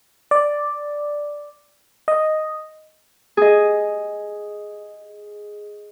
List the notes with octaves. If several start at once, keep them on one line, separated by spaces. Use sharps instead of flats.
D5
D#5
G#4 D#5